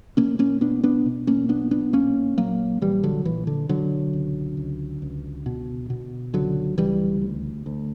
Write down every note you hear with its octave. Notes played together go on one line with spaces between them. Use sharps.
B2 A#3 C#4
A#3 C#4
B2 B3 D4
B3 D4
B2
A#3 C#4
B1 B3 D4
B3 D4
A#1 A#3 C#4
A#1 F#3 A#3
A#1 E3 G3
D3 F#3
A#2 E3
D3
B2 D3 F#3
C#2
C#2
C#2
B2
B2
C#2 D3 F#3
C#2 E3 G3
D2
D2